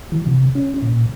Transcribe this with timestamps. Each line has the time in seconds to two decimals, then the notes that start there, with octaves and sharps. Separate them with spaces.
0.12 E3
0.27 C3
0.55 C#4
0.82 A#2